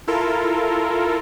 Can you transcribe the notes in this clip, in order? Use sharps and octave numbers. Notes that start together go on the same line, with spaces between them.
E4 F4 A4 A#4